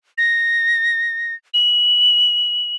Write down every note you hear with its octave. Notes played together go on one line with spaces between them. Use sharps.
A#6
F#7